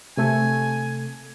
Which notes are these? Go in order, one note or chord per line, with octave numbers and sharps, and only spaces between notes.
C3 A3 A4 G#5